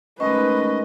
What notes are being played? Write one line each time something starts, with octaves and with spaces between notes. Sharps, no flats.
D#3 G#3 A3 C#4 B4 C5 D#5 C#6